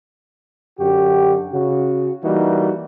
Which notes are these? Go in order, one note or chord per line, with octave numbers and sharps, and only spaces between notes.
F#2 D3 F#4 G4
C#3 F#4
E3 G3 A#3 D#4 F#4